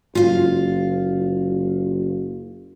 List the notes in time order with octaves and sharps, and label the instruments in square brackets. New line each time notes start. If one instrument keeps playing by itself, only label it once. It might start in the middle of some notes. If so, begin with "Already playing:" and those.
[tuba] F#1 [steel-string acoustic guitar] F4 F5